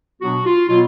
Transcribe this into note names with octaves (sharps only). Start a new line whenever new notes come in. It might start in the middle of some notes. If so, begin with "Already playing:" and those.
B2 F#3 B3 D4 F#4
F4
B2 F#3 B3 F4